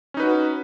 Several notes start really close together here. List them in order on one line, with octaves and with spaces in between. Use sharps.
C#4 D#4 B4 F#4